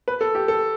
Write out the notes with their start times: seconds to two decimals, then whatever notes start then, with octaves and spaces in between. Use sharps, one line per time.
0.08 B4
0.21 A4
0.35 G4
0.48 A4